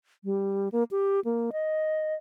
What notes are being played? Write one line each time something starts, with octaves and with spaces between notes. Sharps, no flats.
G3
A#3
G4
A#3
D#5